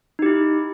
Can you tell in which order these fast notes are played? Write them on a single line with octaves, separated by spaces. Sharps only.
D#4 G4 E4